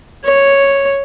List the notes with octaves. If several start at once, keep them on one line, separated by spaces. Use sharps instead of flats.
C#5